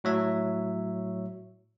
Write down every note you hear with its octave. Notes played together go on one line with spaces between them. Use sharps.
A2 F#3 C#5 E5